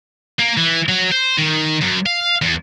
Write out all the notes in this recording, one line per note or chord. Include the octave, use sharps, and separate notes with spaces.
A#3
E3
F#3
C5
D#3
F#2
F5
E2